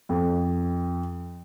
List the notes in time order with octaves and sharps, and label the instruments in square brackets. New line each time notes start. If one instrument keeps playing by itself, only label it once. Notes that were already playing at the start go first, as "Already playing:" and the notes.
[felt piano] F2